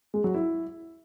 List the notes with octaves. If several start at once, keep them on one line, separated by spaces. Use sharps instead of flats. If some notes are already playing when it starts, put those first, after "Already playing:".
G#3
F#3
E4